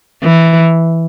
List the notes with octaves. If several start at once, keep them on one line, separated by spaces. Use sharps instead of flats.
E3